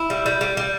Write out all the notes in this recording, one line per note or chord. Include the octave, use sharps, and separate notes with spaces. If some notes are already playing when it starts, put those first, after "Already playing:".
Already playing: E4
G3
G3
G3
G3